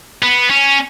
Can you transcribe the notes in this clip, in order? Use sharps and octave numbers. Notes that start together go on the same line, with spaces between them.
B3
C#4